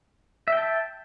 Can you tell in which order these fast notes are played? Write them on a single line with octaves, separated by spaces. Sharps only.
E5 G5 A5